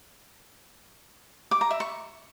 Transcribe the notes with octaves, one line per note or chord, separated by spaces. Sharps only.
D6
A#5
E5
C#6